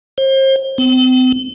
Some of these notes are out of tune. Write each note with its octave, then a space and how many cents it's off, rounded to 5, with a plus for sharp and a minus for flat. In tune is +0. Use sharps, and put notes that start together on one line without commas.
C5 +35
C4 -40